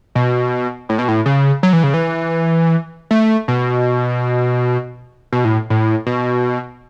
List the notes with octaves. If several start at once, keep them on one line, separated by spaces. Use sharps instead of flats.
B2
A2
B2
A2
C#3
F#3
E3
C#3
E3
A3
B2
B2
A2
A2
B2